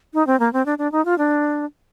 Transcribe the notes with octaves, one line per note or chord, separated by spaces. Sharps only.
D#4
C4
A#3
C4
D4
D4
D#4
F4
D4